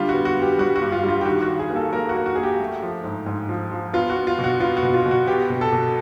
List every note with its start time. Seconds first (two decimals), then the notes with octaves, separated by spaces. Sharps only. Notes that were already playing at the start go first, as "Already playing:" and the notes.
Already playing: D3 G3 F4
0.09 F#4
0.14 B3
0.25 F#4
0.37 B3 G4
0.58 G3 F#4
0.76 F#4
0.81 G2
0.92 F4
1.03 G3
1.08 F4
1.21 G4
1.25 D#3 F#4
1.42 F#4
1.48 D#3
1.59 G#4
1.70 A#3
1.76 A4
1.93 A#3 A#4
2.09 F#4
2.15 A#3
2.26 F#4
2.35 A#3 G#4
2.43 G4
2.60 A3
2.82 F3
3.04 G#2
3.26 G#2
3.49 F3
3.72 F3
3.93 B3 F4
4.10 F#4
4.16 B3
4.27 F4
4.39 B2
4.44 F#4
4.60 B3 F4
4.77 F#4
4.83 B2
4.94 F4
5.06 B2
5.11 F#4
5.27 B3 G4
5.50 B2
5.61 A4
5.73 B2